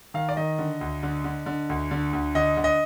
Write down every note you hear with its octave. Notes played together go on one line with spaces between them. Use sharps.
D#3 F5
D5
D#3 D#5
D3
D2
D3
D3
D3
D2
D3
D2
D3 D#5
D3
D#5